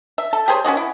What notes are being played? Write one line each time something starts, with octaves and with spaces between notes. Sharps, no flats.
E5
A4
G4 G#4 C5 C#5
C#4 F4 F#4 D#5
E4